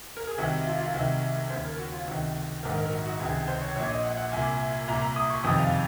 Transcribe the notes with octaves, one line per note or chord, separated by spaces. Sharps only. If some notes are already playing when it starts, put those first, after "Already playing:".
A#4
G#4
C2 C3 D#3 F#4
F4
F4
C2 C3 D#3 F#4
D#2 C#3 C5
A#4
F#4
F4
C#2 C3 D#3 F#4
A#1 G#2 D#3 A#4
A#4
F#4
F#4
C#2 C3 D#3 G#4
C5
C#5
A#1 A#2 C#5
D#5
F#5
F#5
C2 A#2 G#5
C2 A#2 A#5
A#5
D#6
C#6
F#1 F2 C3 D#3 D#6
F5